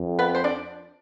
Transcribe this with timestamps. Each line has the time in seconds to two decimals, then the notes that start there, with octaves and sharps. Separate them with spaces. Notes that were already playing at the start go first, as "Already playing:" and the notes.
Already playing: F2
0.19 B3 B4
0.35 C5
0.44 D4 D5